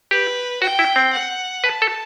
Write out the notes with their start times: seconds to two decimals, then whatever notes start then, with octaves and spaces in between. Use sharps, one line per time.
0.11 G4 B4
0.62 F#4 G5
0.79 E4
0.96 C4
1.13 F#5
1.64 B4 A5
1.82 A4